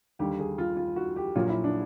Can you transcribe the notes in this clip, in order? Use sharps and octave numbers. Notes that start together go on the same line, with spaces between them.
D#2 D3 G3 G4
G#4
F4
F4
F#4
G4
A#1 A#2 F#3 F4
E4
D4